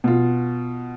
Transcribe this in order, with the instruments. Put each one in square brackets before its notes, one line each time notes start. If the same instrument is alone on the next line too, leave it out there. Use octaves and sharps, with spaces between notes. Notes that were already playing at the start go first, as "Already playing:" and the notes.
[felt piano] B2 F4